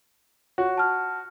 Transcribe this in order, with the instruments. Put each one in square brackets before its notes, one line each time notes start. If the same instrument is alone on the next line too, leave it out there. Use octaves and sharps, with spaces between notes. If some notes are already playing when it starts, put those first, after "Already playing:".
[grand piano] F#4 [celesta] C#5
[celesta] A5 F6